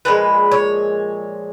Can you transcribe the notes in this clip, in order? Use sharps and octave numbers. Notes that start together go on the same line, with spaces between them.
A#2 F3 G#3 B4
C#5